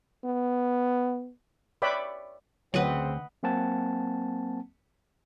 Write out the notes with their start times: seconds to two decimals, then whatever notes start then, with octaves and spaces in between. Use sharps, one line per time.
0.24 B3
1.82 B4 C#5 D5 E5 G5 B5
2.74 D2 C#3 F#3 C4 B4 D#5 F#5
3.43 F#3 A#3 C4 F#5 G#5 A5